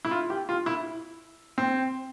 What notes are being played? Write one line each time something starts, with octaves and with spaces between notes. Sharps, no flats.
E4
F4
G4
F4
E4
C4